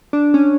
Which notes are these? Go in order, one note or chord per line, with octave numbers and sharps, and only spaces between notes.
D4
C#4